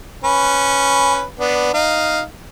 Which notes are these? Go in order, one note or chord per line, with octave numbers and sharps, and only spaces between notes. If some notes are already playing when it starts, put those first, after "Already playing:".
C#4 B4
B3 D4
D#4 F5